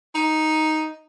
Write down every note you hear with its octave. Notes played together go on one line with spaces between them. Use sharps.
D#4